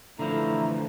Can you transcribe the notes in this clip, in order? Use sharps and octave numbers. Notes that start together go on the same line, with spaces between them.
D3 E3 F3 A3 E4 A#5